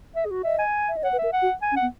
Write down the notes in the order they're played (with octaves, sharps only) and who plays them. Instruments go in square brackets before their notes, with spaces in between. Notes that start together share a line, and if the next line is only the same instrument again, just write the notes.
[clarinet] E5
G#4
F#4
[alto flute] D#5 [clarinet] E5
[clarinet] G#5
[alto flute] E5
D#5
[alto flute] C#5 [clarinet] F#5
[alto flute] B4
[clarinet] E5
[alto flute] A#4
[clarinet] F#5
[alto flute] F#4
[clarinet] G#5
[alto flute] C#4
[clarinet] F#5
[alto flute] B3